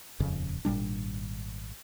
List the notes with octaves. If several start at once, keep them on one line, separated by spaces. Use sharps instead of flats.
D#1 F2 C#3
G#1 A#2 G3 D4